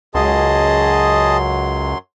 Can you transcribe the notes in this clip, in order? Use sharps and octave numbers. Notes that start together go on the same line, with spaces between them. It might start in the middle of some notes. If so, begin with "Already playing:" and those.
C#2 F#2 F#3 G#4 D#5 A5 C6